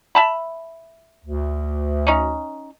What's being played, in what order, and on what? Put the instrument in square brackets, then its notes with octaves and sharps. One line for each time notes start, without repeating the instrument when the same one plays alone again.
[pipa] E5 A5 B5
[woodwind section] D2
[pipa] C#4 D#4